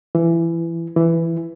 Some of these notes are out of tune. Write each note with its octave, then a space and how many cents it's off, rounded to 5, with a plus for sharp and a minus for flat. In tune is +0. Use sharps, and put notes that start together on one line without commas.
E3 +20
E3 +10